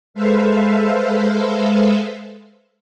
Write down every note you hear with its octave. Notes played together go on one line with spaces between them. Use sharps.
G#3 A4 B4 C5 E5 F5